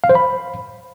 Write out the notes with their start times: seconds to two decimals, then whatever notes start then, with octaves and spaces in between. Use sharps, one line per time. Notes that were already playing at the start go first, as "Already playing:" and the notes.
0.04 F5
0.09 C5
0.15 B5